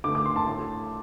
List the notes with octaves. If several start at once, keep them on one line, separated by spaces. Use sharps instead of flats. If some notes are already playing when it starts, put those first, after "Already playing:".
D3 A3 D6
D6
C6
A5
A2 A3